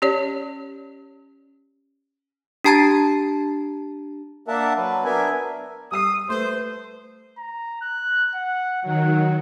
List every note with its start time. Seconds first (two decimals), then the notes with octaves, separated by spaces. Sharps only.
0.02 C#4 G4 C#5 D5
2.64 D4 G4 A5 A#5 G#6 A6
4.48 A#3 D4 A#4 E5 F#5 A5
4.77 F#3 B4
5.05 B3 D4 A#4 E5 G#5
5.92 G3 D#6 E6 C7
6.29 A3 B4 C5
7.38 A#5
7.82 F#6
8.35 F#5
8.82 D#3 F#3 F#5